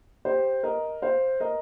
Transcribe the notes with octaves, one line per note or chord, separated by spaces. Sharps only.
G4 C5
A#4 D#5
C5 F5
A#4 D#5